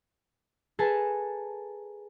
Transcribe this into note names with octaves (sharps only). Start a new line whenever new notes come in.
G#4 A4 B4 A5 A#5